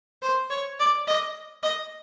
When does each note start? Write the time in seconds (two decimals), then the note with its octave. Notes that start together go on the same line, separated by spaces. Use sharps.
0.22 C5
0.50 C#5
0.79 D5
1.07 D#5
1.63 D#5